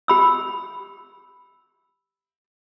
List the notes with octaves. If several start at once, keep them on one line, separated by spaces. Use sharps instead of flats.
G4 B5 E6